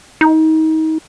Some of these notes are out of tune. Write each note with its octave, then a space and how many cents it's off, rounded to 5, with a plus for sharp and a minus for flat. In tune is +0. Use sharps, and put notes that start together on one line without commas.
D#4 +30